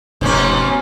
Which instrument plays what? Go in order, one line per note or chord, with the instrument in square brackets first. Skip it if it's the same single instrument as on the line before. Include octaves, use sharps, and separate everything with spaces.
[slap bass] F1 [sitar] G#2 B2 C#4